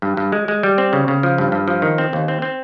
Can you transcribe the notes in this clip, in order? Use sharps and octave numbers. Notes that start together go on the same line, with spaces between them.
G2
G2
G#3
G#3
G3
C4
C#3
C#3
F3
G2
G2
F3
D#3
C4
D#2
C4
C4